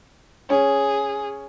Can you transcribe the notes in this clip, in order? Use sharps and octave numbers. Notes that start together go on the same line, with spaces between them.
C#4 G#4